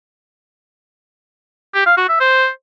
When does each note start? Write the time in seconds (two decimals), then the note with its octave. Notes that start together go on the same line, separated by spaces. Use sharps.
1.74 G4
1.86 F5
1.97 F#4
2.09 E5
2.20 C5